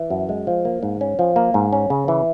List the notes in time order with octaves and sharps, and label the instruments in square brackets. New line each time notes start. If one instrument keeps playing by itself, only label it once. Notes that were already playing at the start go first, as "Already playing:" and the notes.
Already playing: [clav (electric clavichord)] E3
F#2
G#3
F3
A#3
G#2
C#4
F3
A#3
G#2
C#4
C#3
E3